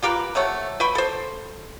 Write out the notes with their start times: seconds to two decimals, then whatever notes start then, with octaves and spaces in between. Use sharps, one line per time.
0.02 F4 G4 A#4 B4
0.35 C3 A3 C#5 F#5
0.80 B4 G5 B5 C#6
0.95 A4 C5